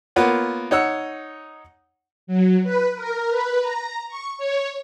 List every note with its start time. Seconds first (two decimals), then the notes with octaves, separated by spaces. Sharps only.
0.16 A#3 B3 F4 C#5 F#5
0.71 D#4 C#5 F#5 E6
2.27 F#3
2.64 B4
2.96 A#4
3.29 B4
3.60 A#5
4.08 C#6
4.38 C#5